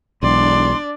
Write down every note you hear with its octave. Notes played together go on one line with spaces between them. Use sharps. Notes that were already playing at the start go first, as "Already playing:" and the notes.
E1 B1 D4 D5 C6